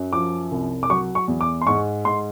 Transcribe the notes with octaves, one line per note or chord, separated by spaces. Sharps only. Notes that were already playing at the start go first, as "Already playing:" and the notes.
Already playing: F#2 F#3
F3 D6
C2
D6
F#3 C#6
C#6
E2
D6
C6
G#2 C#6
G#2 C6